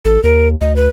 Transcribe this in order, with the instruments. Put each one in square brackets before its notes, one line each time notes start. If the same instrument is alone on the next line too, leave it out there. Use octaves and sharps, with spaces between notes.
[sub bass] A1 [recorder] A4
[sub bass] D#2 [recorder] A#4
[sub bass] D2 [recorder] D#5
[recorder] B4